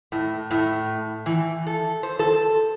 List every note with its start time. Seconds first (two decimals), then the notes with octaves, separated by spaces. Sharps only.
0.12 A2
0.51 A2
1.26 E3
1.67 A4
2.03 C5
2.19 A4